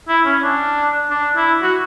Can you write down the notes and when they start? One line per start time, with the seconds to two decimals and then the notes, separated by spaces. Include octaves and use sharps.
0.08 E4
0.26 C#4
0.43 D4
1.11 D4
1.36 E4
1.62 F#4